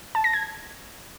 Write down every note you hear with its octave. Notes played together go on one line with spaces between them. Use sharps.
A5
A#6
G#6